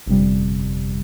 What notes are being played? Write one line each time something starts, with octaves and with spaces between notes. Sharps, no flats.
G1 F2 C3 G3